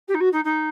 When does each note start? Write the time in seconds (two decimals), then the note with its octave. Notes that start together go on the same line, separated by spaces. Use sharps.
0.08 G4
0.14 D#4
0.20 F#4
0.32 D#4
0.44 D#4